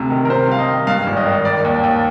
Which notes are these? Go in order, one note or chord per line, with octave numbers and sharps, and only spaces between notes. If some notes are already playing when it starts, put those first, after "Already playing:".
Already playing: D2 C3
D#3
A#4
C3 C5
C2 F5
D#5
D#3
G2 F5
G#1
D#5
D#3
D#3 D5
D#2
D#2